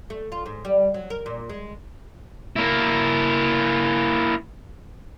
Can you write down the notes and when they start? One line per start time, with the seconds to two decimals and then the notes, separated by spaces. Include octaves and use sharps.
0.10 A3
0.32 F4
0.46 G#2
0.65 G3
0.94 F#3
1.10 A#4
1.26 A#2
1.49 G#3
2.56 A#3 E4